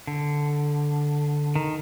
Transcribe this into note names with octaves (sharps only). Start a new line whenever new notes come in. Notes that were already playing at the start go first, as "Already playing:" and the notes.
D3
D#3